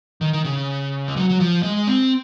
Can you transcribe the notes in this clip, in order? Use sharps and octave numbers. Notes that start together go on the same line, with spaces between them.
D#3
D#3
C#3
G#3
F#3
F#3
F3
G#3
C4